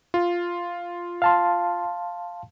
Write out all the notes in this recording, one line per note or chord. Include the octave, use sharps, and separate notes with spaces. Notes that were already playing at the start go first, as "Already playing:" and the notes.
F4
F5 A5 C6